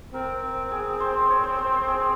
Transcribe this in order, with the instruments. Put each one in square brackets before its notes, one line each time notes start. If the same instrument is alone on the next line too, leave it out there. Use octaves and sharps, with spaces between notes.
[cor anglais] C4 [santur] A#4
[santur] G#4
C5
C#5
C5
C5
C5
G#4